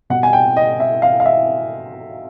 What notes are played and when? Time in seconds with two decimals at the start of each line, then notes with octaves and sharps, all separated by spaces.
0.10 B2 G3 F#5
0.23 G#5
0.33 G5
0.57 D#5
0.80 E5
1.02 F5
1.20 F5
1.26 E5